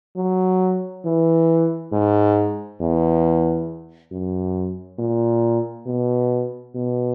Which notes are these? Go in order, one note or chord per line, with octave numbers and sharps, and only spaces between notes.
F#3
E3
G#2
E2
F#2
A#2
B2
B2